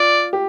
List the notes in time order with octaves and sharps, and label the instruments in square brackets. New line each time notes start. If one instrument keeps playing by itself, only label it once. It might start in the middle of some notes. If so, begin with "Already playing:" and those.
Already playing: [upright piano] F4 [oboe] D5
[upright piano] G4